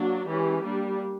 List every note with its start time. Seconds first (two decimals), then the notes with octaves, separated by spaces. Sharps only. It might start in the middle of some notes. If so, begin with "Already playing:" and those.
Already playing: F#3 A#3 D4 F#4
0.27 E3 G#3 C#4 G4
0.63 G3 A#3 D4